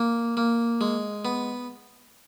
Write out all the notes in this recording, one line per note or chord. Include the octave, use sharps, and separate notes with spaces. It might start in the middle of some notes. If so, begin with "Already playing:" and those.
Already playing: A#3
A#3
G#3
B3